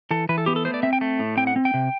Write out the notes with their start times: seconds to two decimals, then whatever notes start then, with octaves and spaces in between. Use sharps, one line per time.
0.11 E3 A4
0.29 E3 B4
0.38 A4
0.46 B3 G4
0.56 A4
0.65 A3 C5
0.74 D5
0.83 C4 E5
0.93 G5
1.01 A3
1.19 A2
1.37 C4 G5
1.47 F#5
1.56 C4
1.65 G5
1.74 C3